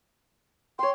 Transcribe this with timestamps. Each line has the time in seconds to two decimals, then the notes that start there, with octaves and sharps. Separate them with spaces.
0.79 C#5 G5 C6